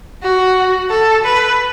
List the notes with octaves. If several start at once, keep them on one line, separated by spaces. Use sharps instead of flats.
F#4
A4
B4